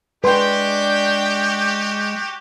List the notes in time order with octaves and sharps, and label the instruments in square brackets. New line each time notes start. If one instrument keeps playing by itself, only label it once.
[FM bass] G#3 [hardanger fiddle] D4 G5 [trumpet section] F#4 G4 [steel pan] B4 C6